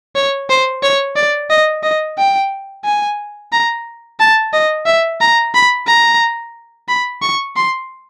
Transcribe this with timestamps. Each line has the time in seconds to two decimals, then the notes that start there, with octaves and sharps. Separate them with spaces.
0.15 C#5
0.50 C5
0.83 C#5
1.16 D5
1.50 D#5
1.83 D#5
2.18 G5
2.85 G#5
3.52 A#5
4.20 A5
4.53 D#5
4.86 E5
5.21 A#5
5.54 B5
5.87 A#5
6.88 B5
7.22 C#6
7.56 C6